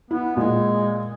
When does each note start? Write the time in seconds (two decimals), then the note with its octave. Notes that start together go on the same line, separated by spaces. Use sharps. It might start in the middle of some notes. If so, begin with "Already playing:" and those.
0.11 B3 E4
0.37 A#2 G#3